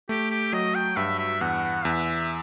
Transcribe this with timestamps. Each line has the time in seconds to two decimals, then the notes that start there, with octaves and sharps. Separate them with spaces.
0.09 A3 G4
0.31 G4
0.53 F#3 D#5
0.75 G5
0.97 G2 E5
1.19 E5
1.41 E2 F#5
1.85 E2 E5